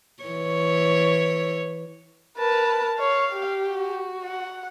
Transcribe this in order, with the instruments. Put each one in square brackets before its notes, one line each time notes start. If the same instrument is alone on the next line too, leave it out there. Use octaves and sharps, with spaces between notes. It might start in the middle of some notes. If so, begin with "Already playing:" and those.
[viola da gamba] E3 C#5
[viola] A#4 A5 [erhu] B4
[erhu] C#5 [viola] F5
[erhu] G4
[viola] F#4
[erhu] F#5